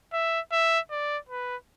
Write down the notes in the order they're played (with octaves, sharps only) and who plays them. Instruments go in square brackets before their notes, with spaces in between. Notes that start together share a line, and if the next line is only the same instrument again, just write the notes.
[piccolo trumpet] E5
E5
D5
B4